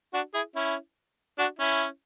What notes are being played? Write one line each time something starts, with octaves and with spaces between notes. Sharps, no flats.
D4 F#4
E4 G#4
C#4 E4
D4 F#4
C#4 E4